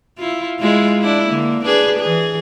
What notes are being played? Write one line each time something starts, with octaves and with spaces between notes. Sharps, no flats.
E4 F4
G#3 E4 F4
D4 E4
D3 A#3
D4 G#4 B4
E3 G#4